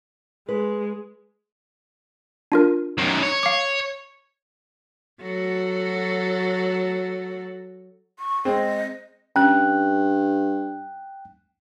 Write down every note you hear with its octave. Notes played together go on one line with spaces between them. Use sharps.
G#3 B4
D4 F4 A#4
F#2 D#3
C#5
F5 D6
F#3 F#4 A4
C#6
G#3 C4 D#5
G2 C#4 G5 F#6